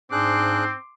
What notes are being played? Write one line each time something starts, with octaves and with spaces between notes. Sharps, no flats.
G#2 C4 D4 G#4 C6 D6 F#6